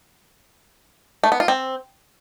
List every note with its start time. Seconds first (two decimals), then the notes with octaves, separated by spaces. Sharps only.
1.24 A3
1.32 B3
1.40 F4
1.48 C4